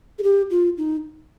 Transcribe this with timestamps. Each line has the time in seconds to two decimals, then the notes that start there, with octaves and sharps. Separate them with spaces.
0.19 G#4
0.23 G4
0.50 F4
0.77 D#4